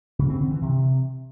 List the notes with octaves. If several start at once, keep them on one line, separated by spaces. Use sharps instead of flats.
C#3
C4
D3
E3
C3